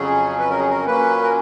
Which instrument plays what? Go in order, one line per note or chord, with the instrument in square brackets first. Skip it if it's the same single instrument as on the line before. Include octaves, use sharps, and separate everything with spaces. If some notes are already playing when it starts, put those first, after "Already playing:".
Already playing: [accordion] F2 C#3 F#3 C#4 G#4
B4
A#4
G#4
A#4
A#2 F#3 A#3 C#4 B4
A#4